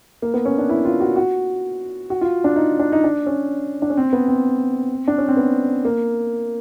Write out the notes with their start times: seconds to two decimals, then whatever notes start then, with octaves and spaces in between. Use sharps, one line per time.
0.22 A#3
0.34 B3
0.45 C#4
0.58 D4
0.69 E4
0.85 F4
1.00 F#4
1.16 F#4
2.10 F#4
2.21 F4
2.44 D4
2.56 D#4
2.80 D4
2.92 D#4
3.04 D4
3.26 C#4
3.82 D4
3.90 C#4
3.97 C4
4.13 B3
4.28 C4
5.08 D4
5.18 C#4
5.28 C4
5.37 B3
5.85 A#3